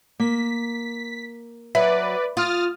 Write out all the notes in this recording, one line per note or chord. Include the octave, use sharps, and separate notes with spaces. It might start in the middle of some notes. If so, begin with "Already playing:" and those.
A#3 B6
F#3 B4 D5 E5
F4 D#6 F6 A6